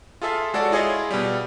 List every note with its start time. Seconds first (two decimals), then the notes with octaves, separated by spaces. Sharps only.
0.22 F4 G#4 A4 E5 F5
0.54 G#3 F#4 A4 C#5 D5
0.71 E4 F4 G#4 C#5 D#5
1.11 B2 G3